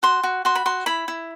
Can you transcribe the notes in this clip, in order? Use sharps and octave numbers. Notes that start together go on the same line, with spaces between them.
F#4 C6
F#4
F#4 C6
B5
F#4 C6
E4 B5
E4